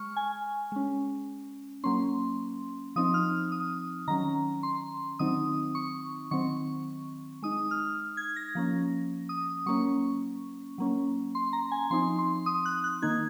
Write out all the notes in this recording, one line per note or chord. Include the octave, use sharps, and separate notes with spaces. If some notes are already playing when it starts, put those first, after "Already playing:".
Already playing: G#3 C#6 F6
G#5
G#3 C#4
F#3 A#3 C#4 C6
F3 C4 D#4 D#6
F6
D#6
D#3 F#3 C#4 A#5
C6
D#3 F#3 C4 D#4 D#6
C#6
D#3 F#3 C4 C#6
G#3 D#4 D#6
F6
G#6
A#6
F3 A#3 C#4
D#6
F#3 A#3 C#4 C#6
F#3 A#3 C#4
C6
A#5
G#5
F3 C4 D#4 C6
C6
D#6
F#6
F#6
D#3 A#3 D#4 G#6